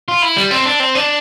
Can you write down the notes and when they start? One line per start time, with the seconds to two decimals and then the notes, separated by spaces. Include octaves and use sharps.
0.08 F4
0.22 E4
0.36 G3
0.51 C4
0.65 D4
0.80 C4
0.95 D4